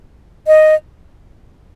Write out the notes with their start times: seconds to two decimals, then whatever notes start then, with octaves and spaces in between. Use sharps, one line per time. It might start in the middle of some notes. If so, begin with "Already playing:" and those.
0.47 D#5